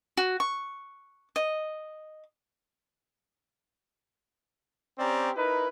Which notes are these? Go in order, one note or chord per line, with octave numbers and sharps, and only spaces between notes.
F#4
C#6
D#5
C4 C#4 G4 D5 A#5
D#4 E4 A#4 B4